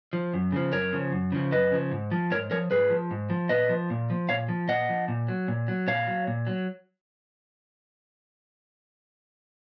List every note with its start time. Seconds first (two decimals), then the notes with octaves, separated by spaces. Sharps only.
0.13 F3
0.34 F#2
0.52 C#3 F3
0.72 F#2 A#4 C#5
0.92 C#3 F3
1.12 F#2
1.32 C#3 F3
1.52 F#2 B4 D#5
1.72 C#3 F3
1.91 G#2
2.11 F3
2.31 G#2 A#4 C#5
2.51 F3 A#4 C#5
2.71 G#2 G#4 B4
2.90 F3
3.11 G#2
3.30 F3
3.49 A#2 B4 D#5
3.69 F3
3.90 A#2
4.10 F3
4.29 A#2 C#5 F5
4.48 F3
4.68 A#2 D#5 F#5
4.89 F3
5.08 A#2
5.28 F#3
5.48 A#2
5.68 F#3
5.87 A#2 C#5 F5
6.07 F#3
6.27 A#2
6.47 F#3